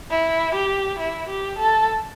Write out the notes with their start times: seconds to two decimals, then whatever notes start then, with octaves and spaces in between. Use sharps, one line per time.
0.11 E4
0.55 G4
0.99 E4
1.29 G4
1.59 A4